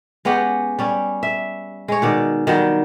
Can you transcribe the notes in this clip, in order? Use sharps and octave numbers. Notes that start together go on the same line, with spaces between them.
G#3 B3 C#4 G4
G3 C#4
E5
G#3 C#5
B2 D#3 D5
D#3 F#3 G3